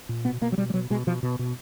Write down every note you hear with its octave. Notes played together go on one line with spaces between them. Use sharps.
A#2
B2 B3
B2 A#3
F#3
B2 G3
G3
B2 F#3
B2 G#3
B2 F3
B2
B2